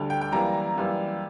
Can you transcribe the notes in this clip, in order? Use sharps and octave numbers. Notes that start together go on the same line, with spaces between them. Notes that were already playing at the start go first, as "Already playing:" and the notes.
Already playing: D2 D3 G3
G5
G5
F#2 E3 G3 A#3 A#5
F#2 E3 G3 A#3